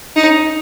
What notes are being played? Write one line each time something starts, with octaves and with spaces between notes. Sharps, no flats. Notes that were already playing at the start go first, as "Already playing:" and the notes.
D#4